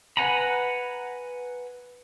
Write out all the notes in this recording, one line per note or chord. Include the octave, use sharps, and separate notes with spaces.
B4 F#5 G#5 A#5 B5